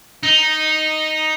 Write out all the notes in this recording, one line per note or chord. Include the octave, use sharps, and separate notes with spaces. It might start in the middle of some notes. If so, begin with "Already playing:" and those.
D#4